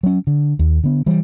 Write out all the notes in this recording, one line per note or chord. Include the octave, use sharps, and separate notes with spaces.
F#3 C#4
D3
D#2
D3 B3
E3 G3